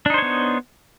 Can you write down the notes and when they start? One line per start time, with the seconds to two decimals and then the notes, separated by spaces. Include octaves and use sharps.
0.06 D4
0.10 D#4
0.14 C5
0.18 C#5
0.22 B3